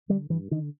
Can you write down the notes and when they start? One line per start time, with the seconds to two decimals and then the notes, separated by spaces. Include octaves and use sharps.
0.09 D3 G3
0.30 G2 E3
0.51 D3 D#3